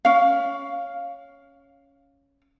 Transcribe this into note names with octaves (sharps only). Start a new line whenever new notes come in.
C#4 F5